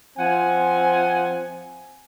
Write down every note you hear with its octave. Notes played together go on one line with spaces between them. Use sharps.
F3 C4 F#5 G#5